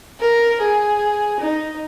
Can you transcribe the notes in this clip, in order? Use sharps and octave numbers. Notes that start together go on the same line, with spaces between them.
A#4
G#4
D#4